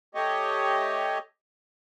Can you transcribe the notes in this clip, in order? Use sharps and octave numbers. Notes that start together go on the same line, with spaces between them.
A3 G4 C#5 D#5